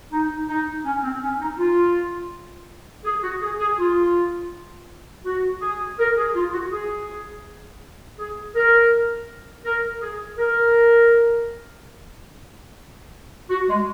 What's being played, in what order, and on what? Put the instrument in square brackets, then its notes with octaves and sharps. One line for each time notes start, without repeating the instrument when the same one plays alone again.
[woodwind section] D#4
D#4
C#4
C4
C#4
D#4
F4
G#4
F#4
G#4
G#4
F4
F#4
G#4
A#4
G#4
F4
F#4
G#4
G#4
A#4
A#4
G#4
A#4
F#4
G#3